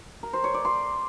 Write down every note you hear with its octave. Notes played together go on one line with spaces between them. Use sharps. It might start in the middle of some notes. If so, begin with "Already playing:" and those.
A#4
C5
C#5
D5
C6